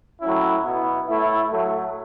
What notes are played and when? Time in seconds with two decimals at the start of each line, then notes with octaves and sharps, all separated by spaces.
0.21 A2 F#3 C#4 E4
0.64 B2 B3 E4
1.08 A2 A3 E4
1.52 A2 F#3 A3